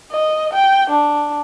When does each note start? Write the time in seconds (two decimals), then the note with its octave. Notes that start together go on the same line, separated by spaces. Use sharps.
0.12 D#5
0.53 G5
0.90 D4